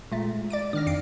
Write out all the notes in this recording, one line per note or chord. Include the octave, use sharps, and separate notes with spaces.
A#2 G#3 A3
D5 D6 D7
D#3 D4 D6 F6 A#6
F2 C7 D7